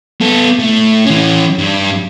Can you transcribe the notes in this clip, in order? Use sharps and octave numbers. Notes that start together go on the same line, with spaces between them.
B3 A4
A2
E3 C#4
G2